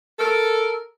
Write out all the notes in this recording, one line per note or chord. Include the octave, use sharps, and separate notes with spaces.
A4 A#4